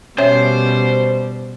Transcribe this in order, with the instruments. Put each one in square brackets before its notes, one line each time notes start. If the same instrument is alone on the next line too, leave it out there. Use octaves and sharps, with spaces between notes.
[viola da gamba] B2 G3 [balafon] C#4 C#5 E5 [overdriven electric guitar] C5